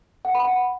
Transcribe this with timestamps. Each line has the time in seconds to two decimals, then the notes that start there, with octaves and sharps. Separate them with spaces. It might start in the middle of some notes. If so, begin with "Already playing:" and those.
0.25 F#5
0.35 B5
0.45 F#5